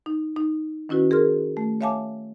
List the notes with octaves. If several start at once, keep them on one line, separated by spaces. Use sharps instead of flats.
D#4
D#4
D#3 C#4 E4 F#4 B4
G#4 A#4 C6 F6
A3
C#5 E5 F5 G#5 A5 D6